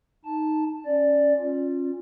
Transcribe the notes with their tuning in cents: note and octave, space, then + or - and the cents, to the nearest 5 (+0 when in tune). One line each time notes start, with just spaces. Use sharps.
D#4 +0 A5 -5
C#4 +0 D5 +0
C#4 -20 F4 +10